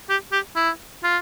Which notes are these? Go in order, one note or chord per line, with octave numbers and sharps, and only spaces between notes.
G4
G4
E4
F4